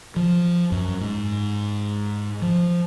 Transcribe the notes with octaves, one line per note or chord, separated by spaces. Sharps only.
F3
F#2
G#2
F3